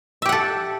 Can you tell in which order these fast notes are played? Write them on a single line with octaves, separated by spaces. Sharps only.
E5 G4 F#5 A4